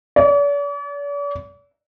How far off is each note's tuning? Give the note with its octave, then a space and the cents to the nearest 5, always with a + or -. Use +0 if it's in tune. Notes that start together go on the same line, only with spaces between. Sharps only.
D5 -45